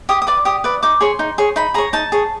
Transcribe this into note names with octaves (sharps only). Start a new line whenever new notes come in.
G4 D#6
D#6
B4 D5 D6
G4 D#6
B4 D5
D#4 D6
G#4 C#5 C6
D#4
G#4 C#5
D#4 B5
G#4 C#5 A#5
D#4 A5
G#4 C#5